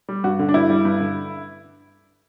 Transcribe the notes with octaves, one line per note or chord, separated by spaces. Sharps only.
G3
G2 F#4
D3
D4
G2 E4
G3
G2
D3